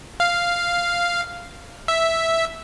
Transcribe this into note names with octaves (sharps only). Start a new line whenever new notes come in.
F5
E5